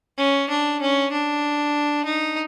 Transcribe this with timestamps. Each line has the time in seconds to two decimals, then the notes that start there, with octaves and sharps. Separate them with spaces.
0.18 C#4
0.50 D4
0.81 C#4
1.12 D4
2.05 D#4